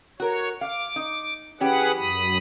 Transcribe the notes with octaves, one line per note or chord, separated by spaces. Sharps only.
F#4 A#4 C#5
F5 D6
D#4
E3 C#4 G4 G#4 B4 F#5
F#2 B5 D#6